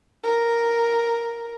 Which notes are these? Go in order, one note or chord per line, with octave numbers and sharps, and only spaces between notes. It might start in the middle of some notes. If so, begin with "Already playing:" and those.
A#4